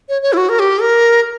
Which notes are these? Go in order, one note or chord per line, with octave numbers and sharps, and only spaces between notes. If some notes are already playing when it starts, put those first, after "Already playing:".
C#5
C#5
E4
F#4
A#4
G4
A#4